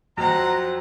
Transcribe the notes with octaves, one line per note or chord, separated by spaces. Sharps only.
F2 F#3 C5 F#5 A#5